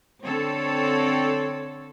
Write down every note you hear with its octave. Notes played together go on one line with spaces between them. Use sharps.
D3 C4 A4 C#5